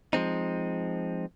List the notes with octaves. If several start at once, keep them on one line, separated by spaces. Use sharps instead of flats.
F3 G#3 C4 D#4